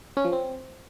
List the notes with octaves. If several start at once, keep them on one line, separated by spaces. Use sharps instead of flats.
C#4
F3
C4